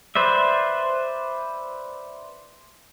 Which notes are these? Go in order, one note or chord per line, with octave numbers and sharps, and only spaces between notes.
B4 C5 D5 E5